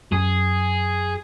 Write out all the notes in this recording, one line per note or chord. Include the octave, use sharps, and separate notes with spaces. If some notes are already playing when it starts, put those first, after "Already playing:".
F#2 G#4